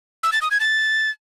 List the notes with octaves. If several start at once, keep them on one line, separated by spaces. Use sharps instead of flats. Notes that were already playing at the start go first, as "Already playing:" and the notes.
E6
A6
D#6
G#6
A6